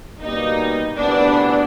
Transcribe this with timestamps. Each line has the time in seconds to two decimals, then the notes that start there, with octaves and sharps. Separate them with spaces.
0.21 B2 G3 A#3 D#4
0.98 D2 C3 E3 G3 B3 D4